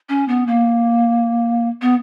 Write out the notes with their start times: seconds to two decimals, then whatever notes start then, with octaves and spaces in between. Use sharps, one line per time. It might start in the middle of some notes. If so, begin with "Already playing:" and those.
0.09 C#4
0.28 B3
0.47 A#3
1.82 B3